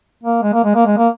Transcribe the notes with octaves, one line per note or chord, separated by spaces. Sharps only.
A#3
G#3
A#3
G#3
A#3
G#3
A#3